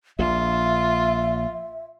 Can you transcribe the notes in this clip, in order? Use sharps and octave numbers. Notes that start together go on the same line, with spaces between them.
A#1 A#2 F4 E5